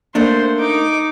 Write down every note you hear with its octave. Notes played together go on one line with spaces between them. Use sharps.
A3 A#3 D4 C5
D#4 D6